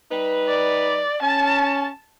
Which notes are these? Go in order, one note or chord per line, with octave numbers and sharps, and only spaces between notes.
G3 D#4 B4
D5
C#4 A5